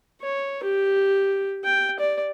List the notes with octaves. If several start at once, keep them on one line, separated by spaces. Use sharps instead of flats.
C#5
G4
G5
D5